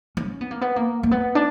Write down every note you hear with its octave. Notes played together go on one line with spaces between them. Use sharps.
C#4
B3
A#3
B3
A#3
A#3
B3
D4